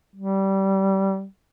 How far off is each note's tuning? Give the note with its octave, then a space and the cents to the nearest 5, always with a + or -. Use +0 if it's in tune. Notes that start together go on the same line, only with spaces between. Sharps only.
G3 -20